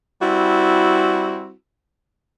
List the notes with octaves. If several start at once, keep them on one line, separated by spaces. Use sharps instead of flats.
G3 C4 E4 F#4